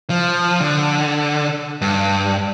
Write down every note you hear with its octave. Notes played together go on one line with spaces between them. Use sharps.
F3
D3
G2